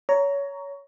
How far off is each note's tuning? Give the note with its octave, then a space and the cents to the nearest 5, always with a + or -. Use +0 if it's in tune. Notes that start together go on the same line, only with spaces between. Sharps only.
C#5 +20 A#5 +0